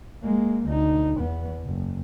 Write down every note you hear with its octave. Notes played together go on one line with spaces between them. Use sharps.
G#3 A#3
D2 D#4
E2 B3
F#1